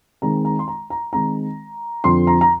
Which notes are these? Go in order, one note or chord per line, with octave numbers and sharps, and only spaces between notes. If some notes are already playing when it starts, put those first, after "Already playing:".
D#3 G#3 C4 A#5
A#5
C6
A#5
A#5
D#3 G#3 C4 A#5
F2 D3 F3 C4 C6
A#5
A#5